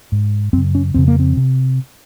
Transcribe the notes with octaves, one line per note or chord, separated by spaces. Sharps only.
G#2
F#2 C#3 C4
C#4
F2 C#3 C4
A#3
C4
C3